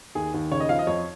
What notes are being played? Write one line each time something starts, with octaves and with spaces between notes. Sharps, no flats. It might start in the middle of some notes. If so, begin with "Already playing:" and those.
D#2 G#4
D#2
C#3 C#5
D#5
F3 F5
D#5
F2 C#5